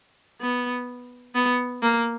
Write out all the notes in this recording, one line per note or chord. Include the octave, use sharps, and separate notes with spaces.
B3
B3
A#3